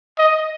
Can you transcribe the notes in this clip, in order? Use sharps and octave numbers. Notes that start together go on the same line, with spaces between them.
D#5